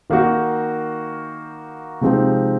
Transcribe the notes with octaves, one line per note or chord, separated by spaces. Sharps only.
D#3 A#3 D#4 F#4
C3 F3 G#3 C4 D#4